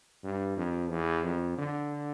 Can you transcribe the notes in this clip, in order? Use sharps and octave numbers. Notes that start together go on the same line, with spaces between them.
G2
F2
E2
F2
D3